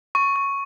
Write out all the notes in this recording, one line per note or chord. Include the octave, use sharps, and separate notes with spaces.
C#6
C#6